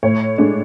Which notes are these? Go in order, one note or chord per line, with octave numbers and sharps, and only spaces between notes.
A2 C#5
G#3 D4